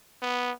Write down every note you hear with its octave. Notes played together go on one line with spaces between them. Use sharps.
B3